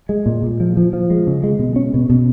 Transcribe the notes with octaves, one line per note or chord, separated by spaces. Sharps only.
G#3
A#2
A#2
F3
F3
F3
G#3
C#3
G#3
B2
C#4
B2
B2